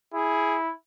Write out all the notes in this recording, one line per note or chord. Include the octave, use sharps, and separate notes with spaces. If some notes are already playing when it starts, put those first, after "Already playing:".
E4 G#4